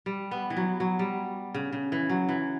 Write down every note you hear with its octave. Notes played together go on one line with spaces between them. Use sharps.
G3
B3
E3
F#3
F#3
G3
C#3
C#3
E3
F#3
E3